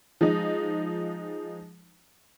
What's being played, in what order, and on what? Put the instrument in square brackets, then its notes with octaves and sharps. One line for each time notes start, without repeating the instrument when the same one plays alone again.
[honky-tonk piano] F3 G#3 D#4